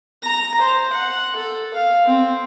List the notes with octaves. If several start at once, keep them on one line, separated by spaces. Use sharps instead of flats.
A#5
C5
F#5
A4
F5
C4